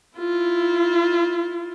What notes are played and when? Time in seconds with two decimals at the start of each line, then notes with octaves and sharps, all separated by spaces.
0.18 E4 F4